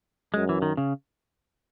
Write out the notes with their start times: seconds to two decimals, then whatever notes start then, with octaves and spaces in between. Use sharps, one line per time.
0.34 F#2 G#3
0.49 E3
0.62 D#3
0.77 C#3